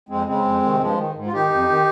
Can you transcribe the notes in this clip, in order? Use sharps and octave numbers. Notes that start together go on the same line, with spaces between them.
F2 G#3 C4
C#3 G#3 C4
F2
C3 D#3
G2 F3 G#3
D#3
G#2
F4
D#3 D#4 G4
F2
D#3